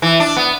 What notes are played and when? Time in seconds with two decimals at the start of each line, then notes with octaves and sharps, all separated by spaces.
0.02 E3
0.20 D4
0.36 B3